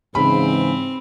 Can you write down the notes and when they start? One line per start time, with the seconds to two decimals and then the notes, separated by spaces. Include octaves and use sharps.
0.15 G#2 C#3 E3 C4 B5